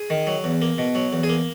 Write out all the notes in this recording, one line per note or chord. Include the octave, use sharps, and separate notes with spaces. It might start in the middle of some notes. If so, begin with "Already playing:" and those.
Already playing: G#4
D#3
F#3
E2
A#3
B2
F#3
E2
G#4
A#3